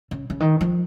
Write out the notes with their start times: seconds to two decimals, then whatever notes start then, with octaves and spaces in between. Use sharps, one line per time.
0.11 C#3
0.30 C#3
0.40 D#3
0.61 F3